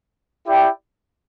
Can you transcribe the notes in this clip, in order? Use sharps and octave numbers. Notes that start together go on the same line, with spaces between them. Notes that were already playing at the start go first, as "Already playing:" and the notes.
E4 G4 D5 G5